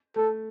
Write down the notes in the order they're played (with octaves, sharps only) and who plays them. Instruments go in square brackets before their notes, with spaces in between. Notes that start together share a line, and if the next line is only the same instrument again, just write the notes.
[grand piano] A3 [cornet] A4